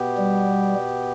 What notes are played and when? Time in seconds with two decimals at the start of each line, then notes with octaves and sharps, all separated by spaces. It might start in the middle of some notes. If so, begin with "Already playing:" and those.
Already playing: B2 B3 G4
0.17 G3